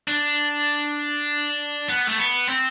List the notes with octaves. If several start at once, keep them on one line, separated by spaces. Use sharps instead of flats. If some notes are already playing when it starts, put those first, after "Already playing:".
D4
B3
A3
B3
C4